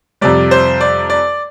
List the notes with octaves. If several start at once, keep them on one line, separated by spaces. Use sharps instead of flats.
F2 C3 G3 D5
C5
D5
D5